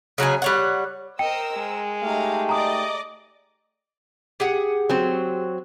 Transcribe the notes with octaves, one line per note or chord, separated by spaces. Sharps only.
C#3 F#3 D#4 G#5
G3 C#5 F#5
A#4 C5 D#5 G5 E6
G#3
A3 D#4 G4 F5 A#5
D5 D#5 A#5 D6 D#6
G4 G#4 F#5
F#3 C4